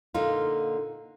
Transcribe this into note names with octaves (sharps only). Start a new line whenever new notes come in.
A#2 D3 D#4 F4